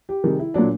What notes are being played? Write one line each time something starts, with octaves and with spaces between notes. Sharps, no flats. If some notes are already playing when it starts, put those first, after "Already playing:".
G4
C3 D#3 G3 G#4
E4
A#2 F#3 D4